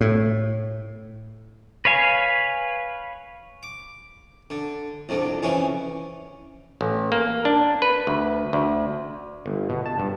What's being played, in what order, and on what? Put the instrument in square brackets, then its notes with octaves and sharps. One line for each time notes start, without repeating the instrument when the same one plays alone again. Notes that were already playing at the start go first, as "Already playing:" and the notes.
[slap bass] A2
[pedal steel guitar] B4 C#5 F5 G#5
[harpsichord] D6
D3
C2 F2 D3
F2 C#3 E3 C#4
[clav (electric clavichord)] A1
A#3
D4
B4
D2
D2
G1
B2
A5
G2